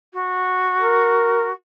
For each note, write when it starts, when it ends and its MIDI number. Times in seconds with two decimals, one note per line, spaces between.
0.13 1.52 66
0.80 1.48 70